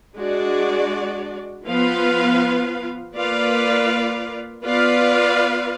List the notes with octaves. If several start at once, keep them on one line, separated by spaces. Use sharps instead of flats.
G#3 D4 F#4 D5
F3 B3 F4 B4 F5
A#3 F4 B4 D5 F5
B3 F4 B4 D5 F5